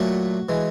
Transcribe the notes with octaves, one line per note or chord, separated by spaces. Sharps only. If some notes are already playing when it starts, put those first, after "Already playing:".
Already playing: A#2 F#3 A3 F#4
E3 G#3